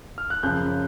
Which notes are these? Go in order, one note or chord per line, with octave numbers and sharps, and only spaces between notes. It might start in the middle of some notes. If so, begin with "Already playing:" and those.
F6
F#6
F#2 C#3 F3 G6